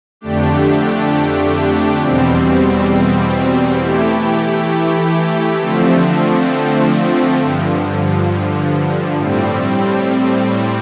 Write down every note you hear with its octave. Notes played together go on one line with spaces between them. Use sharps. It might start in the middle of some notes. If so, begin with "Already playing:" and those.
F2 D3 A3 D4 G4
E2 B2 G3 C4
E3 A3 E4 G4
D3 F3 A3 C4
G2 D3 F3
A2 G3 C4